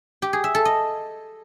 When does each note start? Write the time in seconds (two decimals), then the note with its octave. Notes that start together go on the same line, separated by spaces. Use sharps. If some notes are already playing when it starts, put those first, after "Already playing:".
0.22 G4
0.33 G#4
0.44 E5
0.55 A4
0.65 D#5